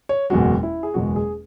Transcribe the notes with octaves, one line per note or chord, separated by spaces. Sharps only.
C#5
F#1 E2 B2 G#3 F#4
E4
G#4
F#1 E2 B2 G#3 F#4
G#4